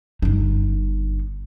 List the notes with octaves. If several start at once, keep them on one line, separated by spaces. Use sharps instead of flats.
G1 D#4